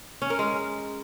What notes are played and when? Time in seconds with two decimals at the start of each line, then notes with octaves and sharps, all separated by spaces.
0.22 C#4
0.30 A#4
0.39 G#3